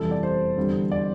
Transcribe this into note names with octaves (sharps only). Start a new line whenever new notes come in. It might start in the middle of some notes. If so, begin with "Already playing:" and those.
Already playing: F1 E2 E3 G3 A4
D5
C5
E2 D3 G3
D5